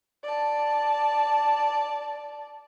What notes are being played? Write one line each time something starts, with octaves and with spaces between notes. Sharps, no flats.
D5 A5